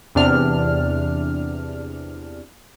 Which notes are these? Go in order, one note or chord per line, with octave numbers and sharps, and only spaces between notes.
E2 C3 D4 F6